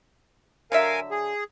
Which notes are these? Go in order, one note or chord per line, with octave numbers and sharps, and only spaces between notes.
D3 F#3 A#4 E5 F5 G#5
G#4